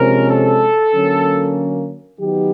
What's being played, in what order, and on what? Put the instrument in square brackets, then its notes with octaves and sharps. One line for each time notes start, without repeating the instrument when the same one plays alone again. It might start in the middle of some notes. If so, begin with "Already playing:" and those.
Already playing: [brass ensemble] C3 F3 G#3 C#4 [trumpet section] A#4
[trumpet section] A4
[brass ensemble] D3 F#3 A#3 C#4
D#3 F#3 B3 D#4 G4